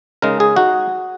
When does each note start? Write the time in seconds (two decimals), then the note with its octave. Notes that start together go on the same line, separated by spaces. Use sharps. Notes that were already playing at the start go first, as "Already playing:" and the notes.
0.22 C#3 G#3 D#4 A#4
0.40 G#4
0.56 D#4 F#4